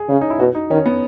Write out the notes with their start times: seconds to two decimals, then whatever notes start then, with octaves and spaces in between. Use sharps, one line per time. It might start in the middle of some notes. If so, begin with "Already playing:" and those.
Already playing: G#4
0.09 C#3 C#4
0.21 D#4
0.30 E4
0.39 B2 F#4
0.55 D#4
0.70 D#3 C#4
0.86 B3